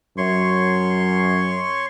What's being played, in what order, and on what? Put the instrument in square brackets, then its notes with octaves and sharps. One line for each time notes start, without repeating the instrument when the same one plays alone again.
[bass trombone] F#2 [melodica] C#5 C6 C#6